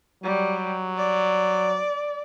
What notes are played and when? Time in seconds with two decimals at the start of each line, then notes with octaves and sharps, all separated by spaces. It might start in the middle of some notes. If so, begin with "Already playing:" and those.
0.24 F#3 G3
0.97 D5